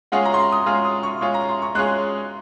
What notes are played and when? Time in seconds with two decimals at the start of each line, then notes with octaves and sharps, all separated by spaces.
0.12 G#3 C#4 F4 G#4 F#5
0.25 A#5
0.34 C6
0.40 A#5
0.52 D#6
0.66 G#3 C#4 F4 G#4 F6
0.85 D#6
1.03 C#6
1.21 G#3 C#4 F4 G#4 C#6
1.34 A#5
1.48 C6
1.62 C#6
1.75 G#3 C#4 F4 G#4 F#6